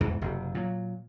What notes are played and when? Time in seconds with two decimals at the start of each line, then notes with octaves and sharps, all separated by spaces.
0.01 E2 G#2 B2 E3
0.22 F#1 C3
0.55 A#2 F#3